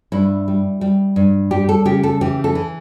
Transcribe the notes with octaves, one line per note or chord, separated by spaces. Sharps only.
G2 E4
G3
G3
G2
G3 G4
A4
C#3 G4
A4
E3 G4
A4
E3